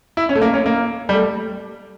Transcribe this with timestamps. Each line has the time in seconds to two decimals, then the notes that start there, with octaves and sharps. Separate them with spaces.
0.17 E4
0.29 C#4
0.35 A3
0.42 A#3
0.53 C#4
0.66 A#3
1.09 G3
1.13 A3